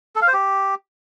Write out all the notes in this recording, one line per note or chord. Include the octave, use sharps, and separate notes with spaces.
A4
F5
C5
G4